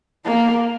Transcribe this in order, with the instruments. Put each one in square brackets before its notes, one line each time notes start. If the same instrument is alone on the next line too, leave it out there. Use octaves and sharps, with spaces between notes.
[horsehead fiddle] A#3